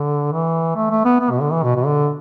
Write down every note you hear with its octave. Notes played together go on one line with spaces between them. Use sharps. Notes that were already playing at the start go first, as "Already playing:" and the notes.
Already playing: D3
E3
A3
A3
B3
B3
B2
D3
E3
B2
B2
D3